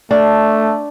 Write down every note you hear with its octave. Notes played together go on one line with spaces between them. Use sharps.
A3 D4